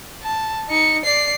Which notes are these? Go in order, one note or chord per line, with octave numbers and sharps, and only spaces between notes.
A5
D#4 C#7
D5 C7